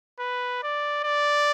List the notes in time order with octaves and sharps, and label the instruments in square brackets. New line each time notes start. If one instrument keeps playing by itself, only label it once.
[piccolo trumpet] B4
D5
D5